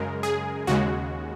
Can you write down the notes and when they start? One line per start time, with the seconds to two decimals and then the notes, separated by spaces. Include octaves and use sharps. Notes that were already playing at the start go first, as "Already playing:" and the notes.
Already playing: F#2 C#3 G#3 A#4
0.23 G#4
0.67 D#2 C#3 G#3 F#4